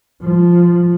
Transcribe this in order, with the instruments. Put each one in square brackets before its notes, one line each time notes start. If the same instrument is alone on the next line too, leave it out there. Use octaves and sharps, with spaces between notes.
[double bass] F3